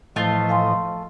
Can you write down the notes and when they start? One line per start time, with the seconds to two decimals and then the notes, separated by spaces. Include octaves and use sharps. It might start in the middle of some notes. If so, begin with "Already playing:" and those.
0.16 A2 E3 F3 A3 F4 D#5
0.49 F5 G#5 C6